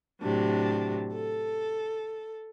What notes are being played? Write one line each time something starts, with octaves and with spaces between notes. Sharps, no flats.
A2 C3 F#3 D4
A4